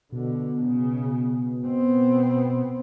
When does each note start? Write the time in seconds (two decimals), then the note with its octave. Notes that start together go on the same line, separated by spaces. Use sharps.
0.12 B2 D3
0.66 C#3
1.66 B3 C4